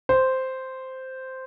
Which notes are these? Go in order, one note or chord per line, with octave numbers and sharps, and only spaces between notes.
C5